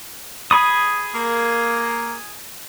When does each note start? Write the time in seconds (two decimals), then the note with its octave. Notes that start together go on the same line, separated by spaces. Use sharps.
0.51 G#4 B5 D#6
1.15 A#3